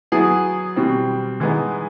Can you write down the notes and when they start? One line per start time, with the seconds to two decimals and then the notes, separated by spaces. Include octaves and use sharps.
0.12 F#3 B3 E4 G#4
0.76 B2 G3 C4
1.40 E3 G#3 B3 D#4